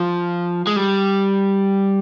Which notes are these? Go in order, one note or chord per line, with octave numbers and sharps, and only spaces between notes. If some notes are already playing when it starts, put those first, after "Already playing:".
Already playing: F3
G#3
G3